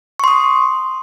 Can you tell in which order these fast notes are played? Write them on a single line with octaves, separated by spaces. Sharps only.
C#6 C6 D#6